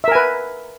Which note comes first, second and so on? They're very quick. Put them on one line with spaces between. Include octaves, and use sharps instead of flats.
E5 A#4 G#5 B4